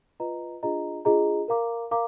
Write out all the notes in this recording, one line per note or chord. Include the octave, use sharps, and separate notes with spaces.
F4 B4 D#5 A#5
D4 F4 G#4 D#5 A#5
D4 F4 G#4 D#5 A#5
A#4 F5 A#5 D6
A#4 F5 A#5 D6